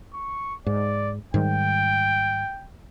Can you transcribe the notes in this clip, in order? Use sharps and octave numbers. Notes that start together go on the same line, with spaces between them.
C#6
G#2 D5
G#2 D#3 G3 G5